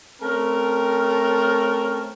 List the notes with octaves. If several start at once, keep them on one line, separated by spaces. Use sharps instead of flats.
A3 C4 C#4 A#4